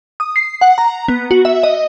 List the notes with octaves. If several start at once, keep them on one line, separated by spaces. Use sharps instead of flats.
D#6
C7
F#5
A#5
B3
F#4
E5
D#5